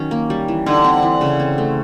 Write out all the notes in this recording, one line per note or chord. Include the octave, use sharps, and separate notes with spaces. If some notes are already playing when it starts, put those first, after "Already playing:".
Already playing: D#3 F#3 C#4
A#3
G3
E3
D3 D#4
C4
E3
C#3
C4
A3